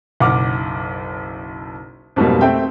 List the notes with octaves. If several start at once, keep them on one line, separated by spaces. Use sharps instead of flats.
F#1 B1 F#5 D6 F6
F2 G#2 B2 F#3 G3 A#3
A3 C4 E5 G5